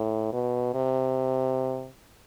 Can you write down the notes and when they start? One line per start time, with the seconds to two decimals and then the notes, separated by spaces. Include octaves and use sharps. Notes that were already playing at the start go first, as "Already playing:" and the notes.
Already playing: A2
0.33 B2
0.74 C3